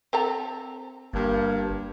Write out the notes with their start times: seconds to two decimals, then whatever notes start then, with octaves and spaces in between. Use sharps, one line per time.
0.13 C4 A4 A#5
1.13 G1 G2 A#3